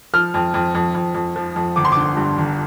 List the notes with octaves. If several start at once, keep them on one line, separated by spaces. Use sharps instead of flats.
F3 F6
F2
F2
F2
F2
F2
F3
F2
G1 D6
C6
D3 D6
G2
G1